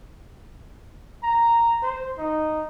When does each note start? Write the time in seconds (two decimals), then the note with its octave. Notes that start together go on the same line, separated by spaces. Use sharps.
1.23 A#5
1.83 C5
2.18 D#4